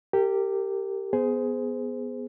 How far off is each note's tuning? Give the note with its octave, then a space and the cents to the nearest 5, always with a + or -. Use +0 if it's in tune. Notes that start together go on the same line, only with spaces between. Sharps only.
G4 +0 A#4 -30
B3 +0 G#4 +10 C5 -20